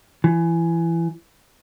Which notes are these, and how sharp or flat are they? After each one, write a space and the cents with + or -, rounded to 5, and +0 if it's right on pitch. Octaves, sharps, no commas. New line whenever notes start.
E3 +20